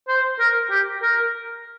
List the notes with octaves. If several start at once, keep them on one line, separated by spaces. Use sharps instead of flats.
C5
A#4
G4
A#4